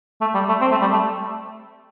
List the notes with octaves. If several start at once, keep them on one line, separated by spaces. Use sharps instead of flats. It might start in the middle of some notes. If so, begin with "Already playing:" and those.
A3
G3
A3
C4
A3
G3
A3